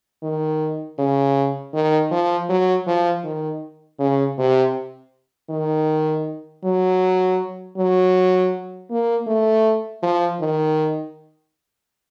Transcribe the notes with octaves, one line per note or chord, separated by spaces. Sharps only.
D#3
C#3
D#3
F3
F#3
F3
D#3
C#3
C3
D#3
F#3
F#3
A#3
A3
F3
D#3